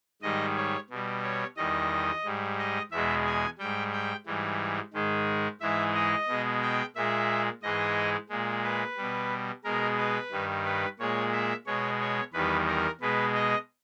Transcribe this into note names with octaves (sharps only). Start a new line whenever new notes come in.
G#2 D#3 G3 D#5
C#5
B2 G3
C#5
E2 D#3 G3 D#5
G#2 G3
D#5
E2 B2 G#3 E5
G#5
G#2 G3 G5
G5
G#2 E3 G3
G#2 D#3 G#3
G#2 E3 G#3 E5
D#5
B2 G#3
G5
A#2 G#3 E5
G#2 E3 G#3 D#5
A#2 G#3
B4
B2 G3
B2 G#3 A#4
B4
G2 D#3 G3
B4
A#2 G#3 C#5
E5
B2 G#3 C#5
C#5
E2 D#3 G3 B4
A#4
B2 G#3 B4
D#5